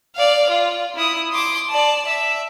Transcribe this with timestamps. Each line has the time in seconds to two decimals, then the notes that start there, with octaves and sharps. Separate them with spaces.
0.16 D5 F5
0.50 F4
0.96 E4 D#6
1.32 C6 D6
1.69 D5 A5
2.07 E5